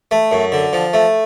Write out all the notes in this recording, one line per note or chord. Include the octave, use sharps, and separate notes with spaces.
A3
F#2
D3
F3
A3